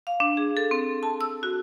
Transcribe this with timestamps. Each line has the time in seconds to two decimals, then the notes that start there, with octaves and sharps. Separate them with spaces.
0.07 F5
0.20 D4
0.37 G#4
0.57 A4
0.71 C4
1.03 A5
1.21 E6
1.43 F#4